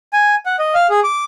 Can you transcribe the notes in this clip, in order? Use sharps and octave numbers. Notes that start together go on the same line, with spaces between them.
G#5
F#5
D#5
F5
G#4
D6